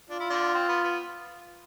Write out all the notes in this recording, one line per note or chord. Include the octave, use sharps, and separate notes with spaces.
D4 F4
E4
D3 D4
C4
B3
B3